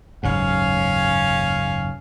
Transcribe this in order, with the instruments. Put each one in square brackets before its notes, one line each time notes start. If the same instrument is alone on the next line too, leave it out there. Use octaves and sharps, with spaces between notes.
[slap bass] F#1 D#2 G#2 [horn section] C#4 F5